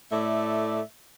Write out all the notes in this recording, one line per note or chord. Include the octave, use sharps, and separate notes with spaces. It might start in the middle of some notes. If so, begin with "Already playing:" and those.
A2 A3 D5 E5